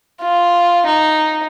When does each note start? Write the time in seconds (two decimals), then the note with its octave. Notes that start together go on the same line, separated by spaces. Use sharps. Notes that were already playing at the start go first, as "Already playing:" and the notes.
0.21 F4
0.86 D#4